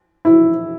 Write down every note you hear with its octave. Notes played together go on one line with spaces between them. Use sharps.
E4